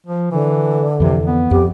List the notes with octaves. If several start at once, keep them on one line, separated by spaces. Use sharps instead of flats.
F3
D3 E3
F2 C3 E3
B3
F2 G4